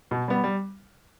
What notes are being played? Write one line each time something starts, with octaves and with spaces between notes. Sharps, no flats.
B2
G3 B3
G3